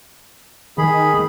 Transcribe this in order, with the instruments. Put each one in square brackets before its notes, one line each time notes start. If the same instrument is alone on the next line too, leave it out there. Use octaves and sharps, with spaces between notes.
[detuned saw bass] D#3 [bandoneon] G#4 B5